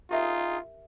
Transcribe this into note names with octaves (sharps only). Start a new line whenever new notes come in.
D#4 F4 G4 G#4 A#4 E5